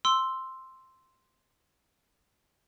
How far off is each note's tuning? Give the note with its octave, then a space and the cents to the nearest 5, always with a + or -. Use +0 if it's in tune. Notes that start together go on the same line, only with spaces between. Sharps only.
C6 +0 E6 +0